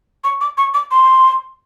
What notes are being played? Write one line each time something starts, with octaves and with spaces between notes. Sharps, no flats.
C#6
D6
C#6
D6
C6